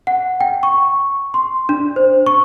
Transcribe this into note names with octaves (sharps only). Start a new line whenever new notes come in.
F#5
G5
C#6
C6
D4
C5
C#6